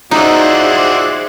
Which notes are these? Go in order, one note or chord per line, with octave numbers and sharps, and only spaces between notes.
D#4 F4 F#4 G#4 C5 D5 E5 F#6